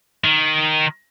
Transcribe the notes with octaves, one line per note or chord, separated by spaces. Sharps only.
D#3